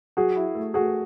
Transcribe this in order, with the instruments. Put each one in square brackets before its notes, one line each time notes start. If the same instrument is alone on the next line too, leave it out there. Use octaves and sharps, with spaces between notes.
[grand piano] F#3 [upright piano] F#4 G#4
[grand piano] E4
A3
[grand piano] A3 [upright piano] F#4 G#4